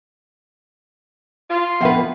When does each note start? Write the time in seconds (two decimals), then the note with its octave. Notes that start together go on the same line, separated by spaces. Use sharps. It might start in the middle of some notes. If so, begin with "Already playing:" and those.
1.50 F4
1.81 F2 B2 F3 B4 E5 F#5 G5